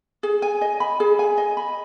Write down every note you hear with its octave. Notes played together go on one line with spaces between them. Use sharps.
G#4
G#5
D#5
B5
G#4
G#5
D#5
B5